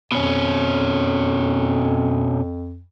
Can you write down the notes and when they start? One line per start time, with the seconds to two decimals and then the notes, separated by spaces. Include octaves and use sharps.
0.12 F2 B2 C#4